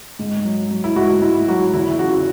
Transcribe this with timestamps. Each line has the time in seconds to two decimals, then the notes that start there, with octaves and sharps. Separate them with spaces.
0.19 G#2
0.44 F#3
0.71 F#3
0.84 E4
0.96 G#2 F#4
1.22 G#2 E4
1.48 F#3 F#4
1.74 E2 E4
1.99 C#3 F#4